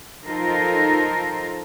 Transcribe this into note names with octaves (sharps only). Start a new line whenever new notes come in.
F3 D#4 F4 A4 A#4 C5